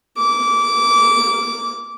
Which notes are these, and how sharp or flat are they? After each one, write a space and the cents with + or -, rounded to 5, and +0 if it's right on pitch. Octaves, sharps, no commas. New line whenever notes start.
D6 -20